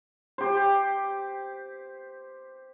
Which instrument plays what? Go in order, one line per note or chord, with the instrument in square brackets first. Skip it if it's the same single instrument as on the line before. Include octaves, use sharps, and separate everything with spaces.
[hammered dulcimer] G4 C5